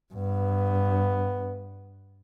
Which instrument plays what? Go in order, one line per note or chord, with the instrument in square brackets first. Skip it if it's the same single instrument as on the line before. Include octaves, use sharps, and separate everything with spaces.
[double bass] G2 [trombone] B3